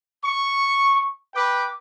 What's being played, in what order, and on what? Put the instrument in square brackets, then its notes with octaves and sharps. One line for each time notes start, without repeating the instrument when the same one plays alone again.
[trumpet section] C#6
B4 G5 D6